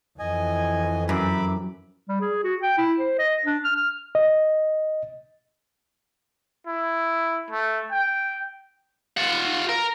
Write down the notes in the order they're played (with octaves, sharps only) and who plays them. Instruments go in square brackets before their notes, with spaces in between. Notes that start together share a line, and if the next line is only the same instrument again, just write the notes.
[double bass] F2 E3 [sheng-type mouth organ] D#5 G#5
[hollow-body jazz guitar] F#2 [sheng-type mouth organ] E5 B5 D6
[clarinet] G3
G#4
F#4
G5
E4
C5
D#5
D4
F6
F6
[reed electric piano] D#5
[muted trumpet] E4
A3
G5
[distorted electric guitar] F4 F#5
A#4